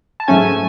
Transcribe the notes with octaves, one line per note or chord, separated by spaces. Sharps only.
A5
G#2 F#3 A3 C#4 G#5